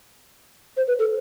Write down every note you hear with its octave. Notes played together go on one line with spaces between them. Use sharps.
C5
B4
A4